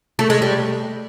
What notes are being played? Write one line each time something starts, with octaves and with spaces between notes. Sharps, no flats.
A3
G#3
G3